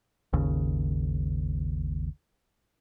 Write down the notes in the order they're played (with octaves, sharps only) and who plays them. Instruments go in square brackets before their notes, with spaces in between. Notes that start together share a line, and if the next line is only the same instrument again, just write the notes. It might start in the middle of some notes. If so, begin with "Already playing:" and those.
[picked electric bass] G#1 D#2 C#3